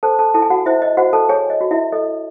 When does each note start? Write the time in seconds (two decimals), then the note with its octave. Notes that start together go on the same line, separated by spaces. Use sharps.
0.03 A4 C5 A5
0.19 A4 A5
0.34 E4 A4 A5
0.42 G#5
0.50 F#4 F#5
0.66 E4 C5 E5
0.82 D#5
0.97 F#4 C5 F#5
1.13 A4 A5
1.29 G#4 C#5 G#5
1.50 D#5
1.61 F#4
1.71 E4 E5
1.92 A4 D#5